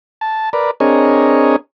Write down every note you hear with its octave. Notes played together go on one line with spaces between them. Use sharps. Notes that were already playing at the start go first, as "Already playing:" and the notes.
A5
A#4 B4 D5
C4 D4 G#4 A#4 C#5 D#5